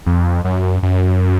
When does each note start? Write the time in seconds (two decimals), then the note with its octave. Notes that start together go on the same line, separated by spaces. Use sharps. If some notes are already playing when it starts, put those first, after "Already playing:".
0.06 F2
0.44 F#2
0.83 F#2